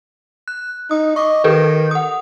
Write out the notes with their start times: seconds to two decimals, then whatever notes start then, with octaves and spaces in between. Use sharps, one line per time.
0.48 F#6
0.91 D#4 D#6
1.16 D#5 C#6 D6
1.44 D#3 G4 A4 B4
1.91 F#5 D#6